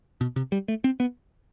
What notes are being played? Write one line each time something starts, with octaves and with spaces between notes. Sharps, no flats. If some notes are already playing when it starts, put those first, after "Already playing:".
B2
C3
G3
A3
C4
B3